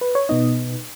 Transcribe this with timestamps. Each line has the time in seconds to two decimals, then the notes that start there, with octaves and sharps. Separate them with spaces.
0.01 B4
0.15 C#5
0.29 B2 B3 D#4 D#5